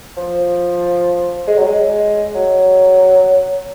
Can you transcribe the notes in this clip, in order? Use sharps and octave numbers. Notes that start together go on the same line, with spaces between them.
F3
G#3
F#3
G#3
F#3